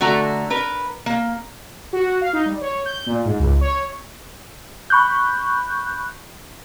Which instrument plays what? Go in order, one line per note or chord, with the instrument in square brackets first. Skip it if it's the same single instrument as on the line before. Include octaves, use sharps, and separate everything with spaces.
[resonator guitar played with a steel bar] D3 A3 F#4 A#5
A#4 B4
A#3
[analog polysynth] F#4
F5
D#4
G3
C#5
G6
A#2
G#2
C#2
C#5
[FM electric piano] B5 C#6 F#6 G6